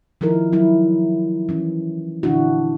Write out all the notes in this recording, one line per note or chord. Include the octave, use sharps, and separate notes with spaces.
D#3 F3 D#4 E4 A#4
F#3 E4
E3 C#4
A#2 D3 E3 D4 E4 F#4